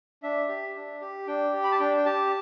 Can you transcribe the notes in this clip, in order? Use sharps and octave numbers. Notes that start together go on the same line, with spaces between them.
D4 E5
G4
D4
G4
D4 G5
G4
B5
A5
D4 G5
G5
G4 A5